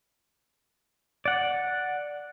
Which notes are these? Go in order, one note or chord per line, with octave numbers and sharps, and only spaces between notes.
D5 F#5